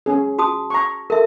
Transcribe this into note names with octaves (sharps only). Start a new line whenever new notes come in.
C#4 G#4
F#4 A5 D#6
A#5 C#6
A4 A#4 E5